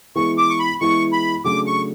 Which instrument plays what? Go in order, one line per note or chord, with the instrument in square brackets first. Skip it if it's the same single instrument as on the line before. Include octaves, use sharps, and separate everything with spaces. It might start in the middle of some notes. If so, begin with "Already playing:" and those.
[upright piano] E3 G#3 B3 E4 G#4 [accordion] C#6
[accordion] D6
C#6
B5
[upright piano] E3 G#3 B3 E4 G#4 [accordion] C#6
[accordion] B5
[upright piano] C#3 F#3 A3 D4 G#4 [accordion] D6
[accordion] C#6